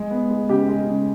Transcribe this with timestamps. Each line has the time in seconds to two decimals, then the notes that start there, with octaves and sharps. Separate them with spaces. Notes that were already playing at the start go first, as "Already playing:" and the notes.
Already playing: G#3
0.11 B3
0.30 G#3
0.49 C#3 G4
0.68 G#3
0.87 C#3